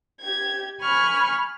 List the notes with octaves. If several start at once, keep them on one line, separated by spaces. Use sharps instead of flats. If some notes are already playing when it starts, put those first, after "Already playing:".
G4 G#6
G#5 B5 C#6 F6